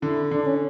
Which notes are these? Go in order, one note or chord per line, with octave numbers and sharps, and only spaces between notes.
D3 E4
D3 D4
C#4